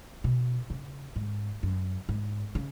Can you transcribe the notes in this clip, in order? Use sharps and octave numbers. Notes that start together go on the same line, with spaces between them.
B2
C#3
G#2
F#2
G#2
C#3